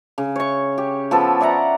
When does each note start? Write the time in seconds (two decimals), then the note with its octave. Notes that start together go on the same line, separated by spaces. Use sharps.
0.18 C#3
0.36 C#5 C#6
0.78 G4
1.11 F3 B3 A4
1.40 D5 E5 F#5 A#5